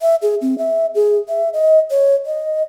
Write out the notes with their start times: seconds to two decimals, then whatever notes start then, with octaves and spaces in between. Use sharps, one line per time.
0.01 E5
0.22 G#4
0.42 C4
0.58 E5
0.95 G#4
1.28 E5
1.53 D#5
1.91 C#5
2.26 D#5